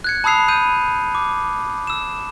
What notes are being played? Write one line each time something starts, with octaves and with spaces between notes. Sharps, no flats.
F#6 G#6 C#7
A5 B5 D#6 E6 C7 F7
B5 E6 G6 D#7
D6
E6 E7